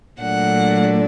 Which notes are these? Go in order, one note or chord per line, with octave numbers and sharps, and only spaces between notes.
A#2 F#3 A3 D4 F#5